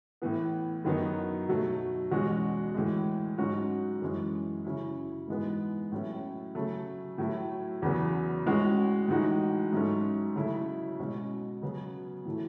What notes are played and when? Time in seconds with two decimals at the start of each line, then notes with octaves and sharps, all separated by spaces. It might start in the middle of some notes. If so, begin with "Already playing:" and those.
0.22 A2 E3 B3
0.85 F#2 D#3 F#3 B3 D#4
1.48 B2 F#3 A3
2.11 E2 B2 G#3 C#4 F#4
2.74 A2 E3 G#3
3.38 G#2 F#3 C#4 F#4
4.02 F#2 E3 G#3 C#4
4.64 C#3 F#3 C#4 E4
5.28 G#2 E3 G#3 B3
5.92 A2 F#3 C#4 E4
6.55 C#3 F#3 A3
7.18 A2 F#3 A3 E4
7.82 E2 C#3 F#3 B3
8.46 A2 G#3 C#4 F#4
9.08 A2 E3 G#3 D#4 F#4
9.72 G#2 F#3 A3 C#4
10.35 C#3 F#3 A3 E4
10.99 B2 G#3 C#4
11.62 C#3 F#3 B3
12.25 A2 E3 A3 E4